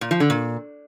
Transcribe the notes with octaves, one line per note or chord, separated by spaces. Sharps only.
A#2
F3
D3
A#2